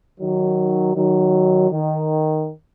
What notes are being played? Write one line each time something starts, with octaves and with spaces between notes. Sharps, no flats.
D#3 F#3
D#3 F#3
D#3